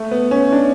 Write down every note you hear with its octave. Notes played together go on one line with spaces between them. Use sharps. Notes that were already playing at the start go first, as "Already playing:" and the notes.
Already playing: A3
B3
C#4
D4